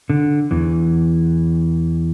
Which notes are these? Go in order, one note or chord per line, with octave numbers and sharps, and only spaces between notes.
D3
E2 E3